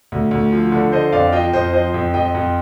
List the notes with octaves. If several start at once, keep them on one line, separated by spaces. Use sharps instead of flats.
D2
D2
F3
D3
D3 C5 D#5
F2 D5 F5
F3 D#5 G5
F2 C5 D#5
F3 C5 D#5
F2
F2 D#5 G5
F2